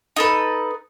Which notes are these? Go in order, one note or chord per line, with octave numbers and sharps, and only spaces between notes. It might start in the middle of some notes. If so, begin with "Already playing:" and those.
D#4 A4 B4